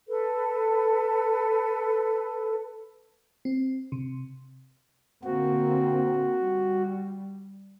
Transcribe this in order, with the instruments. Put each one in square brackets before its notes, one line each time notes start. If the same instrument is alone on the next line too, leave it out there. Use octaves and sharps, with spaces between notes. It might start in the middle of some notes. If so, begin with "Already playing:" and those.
[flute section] A4 B4
[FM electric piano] C4
C3
[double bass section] D3 A#3 C4 [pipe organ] F#4
[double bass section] G3